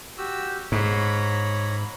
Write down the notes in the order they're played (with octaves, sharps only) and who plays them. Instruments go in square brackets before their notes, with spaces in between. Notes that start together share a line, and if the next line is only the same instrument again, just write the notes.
[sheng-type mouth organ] F#4 G4 E6
[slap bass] G#2 [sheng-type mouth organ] C#5 A#5 B5